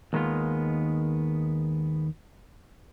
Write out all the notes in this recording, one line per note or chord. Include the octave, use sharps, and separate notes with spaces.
D#2 D#3 G#3 B3 F4